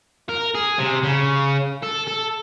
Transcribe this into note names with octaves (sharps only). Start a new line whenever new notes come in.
A#4
G#4
C3
C#3
A4
A4